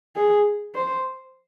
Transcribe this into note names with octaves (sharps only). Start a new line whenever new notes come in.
G#4
C5